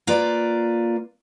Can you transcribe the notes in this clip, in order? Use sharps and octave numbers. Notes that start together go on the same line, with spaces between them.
A#3 F4 B4 D5